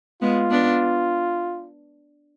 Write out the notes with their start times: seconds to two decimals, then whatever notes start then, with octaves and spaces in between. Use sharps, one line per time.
0.22 G#3 B3 F4
0.51 B3 D4